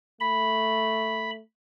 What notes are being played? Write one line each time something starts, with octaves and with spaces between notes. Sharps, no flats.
A3 B5